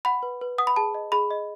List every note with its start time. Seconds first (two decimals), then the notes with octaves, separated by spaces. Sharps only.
0.05 F#5 B5
0.23 B4
0.41 B4
0.58 F#5 D#6
0.67 B5
0.76 G#4 A5
0.95 D#5
1.12 G#4 B5
1.31 D#5